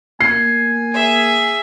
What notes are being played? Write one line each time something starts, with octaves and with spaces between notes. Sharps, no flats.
A#3 G#5 C7
G#4 E5